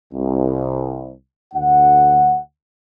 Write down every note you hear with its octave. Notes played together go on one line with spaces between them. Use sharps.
C2
D2 F#5